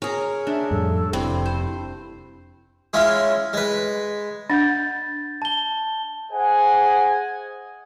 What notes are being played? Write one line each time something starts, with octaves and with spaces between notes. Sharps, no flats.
C#4 G#4 A#4
D4 E5
F2 A2 G3 A4
F1 G2 C4 E4
C5
G#3 C#4 E4 F4
G#3 B4
D4 F#5 G6 A6
A5 G7
G#4 C5 D#5 F#5 G#5